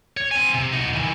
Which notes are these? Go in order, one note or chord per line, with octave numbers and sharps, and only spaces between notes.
C#5
C4 G#5
C3
D#4 F#4
D#3 E3